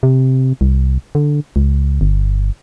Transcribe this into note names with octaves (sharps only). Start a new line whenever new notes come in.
C3
C2
D3
C#2
G1